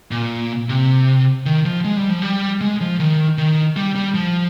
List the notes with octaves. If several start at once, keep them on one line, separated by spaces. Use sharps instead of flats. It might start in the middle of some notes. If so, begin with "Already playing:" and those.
A#2
C3
D#3
F3
G#3
G3
F3
G3
G#3
F3
D#3
D#3
G3
G3
F3